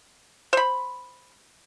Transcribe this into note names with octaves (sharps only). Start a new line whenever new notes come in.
C5 B5